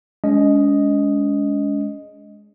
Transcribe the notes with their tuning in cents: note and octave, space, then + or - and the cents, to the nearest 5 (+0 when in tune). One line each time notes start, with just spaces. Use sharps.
G#3 +0 C#4 +45 D#5 +0